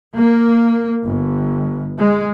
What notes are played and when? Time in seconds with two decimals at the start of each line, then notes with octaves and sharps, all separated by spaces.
0.14 A#3
1.04 G1
1.98 G#3